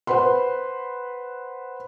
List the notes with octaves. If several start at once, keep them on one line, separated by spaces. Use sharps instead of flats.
B4 C5 F#5 B5 C6